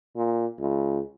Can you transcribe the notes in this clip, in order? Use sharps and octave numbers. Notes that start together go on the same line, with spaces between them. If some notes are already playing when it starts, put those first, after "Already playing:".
A#2
C#2